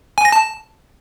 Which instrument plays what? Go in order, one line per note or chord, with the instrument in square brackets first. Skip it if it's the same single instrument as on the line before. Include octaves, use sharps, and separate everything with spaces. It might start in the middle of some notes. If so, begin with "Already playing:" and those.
[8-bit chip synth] G#5
A#6
A5